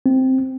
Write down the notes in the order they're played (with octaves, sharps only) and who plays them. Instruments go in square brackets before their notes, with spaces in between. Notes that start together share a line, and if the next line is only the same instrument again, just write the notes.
[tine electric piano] C4